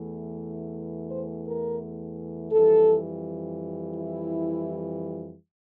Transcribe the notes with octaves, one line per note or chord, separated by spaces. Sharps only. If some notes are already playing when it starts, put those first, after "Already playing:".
Already playing: E2 E3 A3
C5
A#4
F2 E3 G3 A4
E4